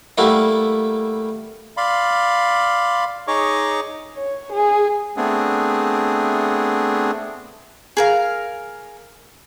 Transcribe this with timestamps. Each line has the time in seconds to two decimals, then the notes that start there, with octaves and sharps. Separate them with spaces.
0.18 G3 A3 A#3 E4 F#5
1.77 D5 F5 B5 C6
3.28 D#4 G#4 C#5 D#5 C#6 D6
4.16 C#5
4.52 G#4
5.17 A3 B3 C4 D4 G#4
7.97 G#4 A#4 F5